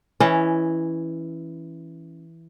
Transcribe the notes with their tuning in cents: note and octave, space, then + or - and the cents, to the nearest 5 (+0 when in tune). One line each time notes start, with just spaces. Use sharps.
E3 +0 C#4 +0 D#5 +35